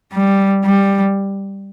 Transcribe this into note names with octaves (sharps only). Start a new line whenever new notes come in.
G3
G3